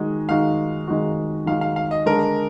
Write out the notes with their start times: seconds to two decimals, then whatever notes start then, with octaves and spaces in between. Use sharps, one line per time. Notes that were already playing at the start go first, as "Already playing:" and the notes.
Already playing: D#3 G#3 D#4 F#4
0.29 D#3 G#3 D#4 F#4 F5
0.87 D#3 G#3 D#4 F#4
1.46 D#3 G#3 D#4 F#4 F5
1.61 F5
1.76 F5
1.91 D#5
2.06 D3 G#3 D4 A#4